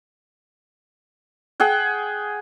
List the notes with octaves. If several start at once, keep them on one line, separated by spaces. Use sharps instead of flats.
G#4 F#5 G5